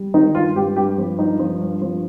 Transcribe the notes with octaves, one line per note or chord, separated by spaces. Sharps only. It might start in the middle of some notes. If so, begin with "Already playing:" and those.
Already playing: G3
D#3 D#4
G2 F4
G2 G4
G2 G4
F3
G2 D#4
F3
G2
F3